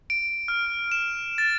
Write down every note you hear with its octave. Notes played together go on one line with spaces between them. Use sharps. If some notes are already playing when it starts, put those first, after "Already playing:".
D7
F6
E7
A6